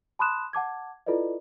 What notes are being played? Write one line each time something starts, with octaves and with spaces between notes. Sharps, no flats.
A5 B5 C6 D#6 F#6 E7
F#5 A5 D6 G#6
E4 F4 A4 B4 D5 D#5